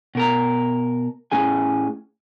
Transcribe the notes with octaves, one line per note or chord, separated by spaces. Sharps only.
B2 A#4 A#5
A2 C#4 G#4 G#5